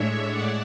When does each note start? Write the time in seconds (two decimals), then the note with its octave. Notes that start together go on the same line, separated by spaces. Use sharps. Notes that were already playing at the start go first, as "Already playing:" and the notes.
Already playing: A2 G#3 D4 C#5 E5
0.28 D5 F#5